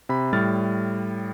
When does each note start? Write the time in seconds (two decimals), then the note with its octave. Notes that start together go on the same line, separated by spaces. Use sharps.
0.09 C3 B5
0.33 A2 G3 F6 A6